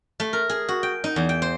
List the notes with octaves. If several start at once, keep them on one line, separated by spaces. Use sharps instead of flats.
A3
A#4
G#4
F#4
G5
D#4
E2
G5
C5